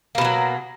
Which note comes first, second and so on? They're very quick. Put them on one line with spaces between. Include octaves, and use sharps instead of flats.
A#3 B2 D#3 F#3